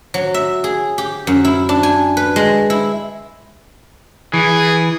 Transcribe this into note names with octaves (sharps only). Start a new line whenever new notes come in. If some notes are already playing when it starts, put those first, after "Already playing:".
F#3
E5
G#4
G4
F#2
E4
D4
G#5
B4
G#3
E4
E3 G#4